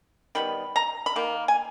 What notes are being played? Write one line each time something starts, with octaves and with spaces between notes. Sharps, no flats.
D#3 G3 B3 B5
A#5
B5
D#3 A#3
G#5